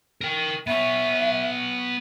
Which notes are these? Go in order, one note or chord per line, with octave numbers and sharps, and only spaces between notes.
A#4 G5
B3 C#5 E5